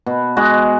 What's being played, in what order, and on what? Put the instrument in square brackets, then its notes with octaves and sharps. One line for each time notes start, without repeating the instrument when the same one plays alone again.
[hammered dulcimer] B2
G#3 F#4